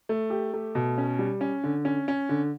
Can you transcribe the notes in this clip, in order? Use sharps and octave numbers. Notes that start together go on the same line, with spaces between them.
A3
G4
A3
B2
C#4
G3
C#4
D3
C#4
C#4
D3